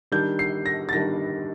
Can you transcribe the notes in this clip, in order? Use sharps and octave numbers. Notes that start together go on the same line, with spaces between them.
D#3 G3 D4 G6
C7
A#6
A6
D#3 G3 D4 A#6